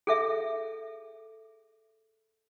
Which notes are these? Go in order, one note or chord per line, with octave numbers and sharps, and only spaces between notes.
G#4 A4 E5